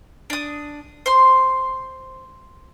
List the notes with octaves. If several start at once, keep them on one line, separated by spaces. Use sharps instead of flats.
D4 D#6
C5 C6